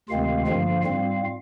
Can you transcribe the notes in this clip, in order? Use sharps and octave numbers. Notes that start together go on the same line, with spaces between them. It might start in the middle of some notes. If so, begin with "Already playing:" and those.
D2 C3 D#3 G#3 C4 F4 F5
G2 D3 F3 A#3 F4 F5
G#2 G3 C4 F4 F5